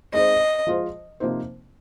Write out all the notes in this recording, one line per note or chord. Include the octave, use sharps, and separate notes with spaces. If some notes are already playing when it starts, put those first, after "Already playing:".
G#3 C4 D#4 C5 D#5
F3 G#3 F4 C5
C3 F3 A#3 D#4 C5